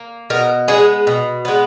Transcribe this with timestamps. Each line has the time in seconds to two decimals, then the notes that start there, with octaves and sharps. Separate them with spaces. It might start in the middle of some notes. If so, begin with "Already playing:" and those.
Already playing: A#3
0.30 B2 A#4
0.68 G#3 B3 G#4
1.07 B2
1.45 G#3 B3